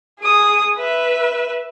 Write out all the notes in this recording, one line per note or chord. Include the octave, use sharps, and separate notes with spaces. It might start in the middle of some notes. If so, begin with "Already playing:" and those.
G#4 D#6
B4 E5